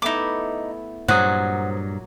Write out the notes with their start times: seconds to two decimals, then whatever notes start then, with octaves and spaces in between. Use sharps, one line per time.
0.02 A3 B3 D#4 E4 D6
1.08 G2 A#2 F#3 C5 F#5 D#6